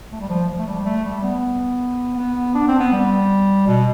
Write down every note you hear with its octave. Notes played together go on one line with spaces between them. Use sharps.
A3
G3
F3
F3
A3
G3
A3
G3
B3
B3
D4
C4
B3
G3
B2